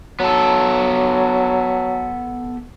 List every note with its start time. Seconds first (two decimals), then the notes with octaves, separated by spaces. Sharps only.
0.20 F#3 B3 A4